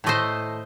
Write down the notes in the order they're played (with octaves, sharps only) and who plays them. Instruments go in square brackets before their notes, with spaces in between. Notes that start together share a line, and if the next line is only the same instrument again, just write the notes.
[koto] A2 A3 C5 D#5